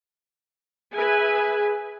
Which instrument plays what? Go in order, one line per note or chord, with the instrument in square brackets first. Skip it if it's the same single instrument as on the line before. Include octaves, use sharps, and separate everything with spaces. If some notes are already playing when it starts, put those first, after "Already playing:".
[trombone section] G#4 [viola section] B4 E5 G#5